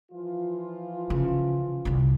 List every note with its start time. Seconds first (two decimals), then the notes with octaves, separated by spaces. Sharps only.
0.11 E3 F3 F4
1.10 C#3
1.85 C2 D3